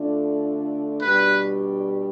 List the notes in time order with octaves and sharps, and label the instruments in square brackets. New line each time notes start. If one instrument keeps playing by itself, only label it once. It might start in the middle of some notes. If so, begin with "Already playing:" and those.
Already playing: [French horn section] D3 A3 D4 F4
[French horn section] B2 G3 D4 G4 [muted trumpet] B4